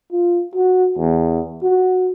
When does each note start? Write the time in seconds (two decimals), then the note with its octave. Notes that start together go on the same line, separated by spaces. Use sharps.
0.12 F4
0.56 F#4
0.99 E2
1.63 F#4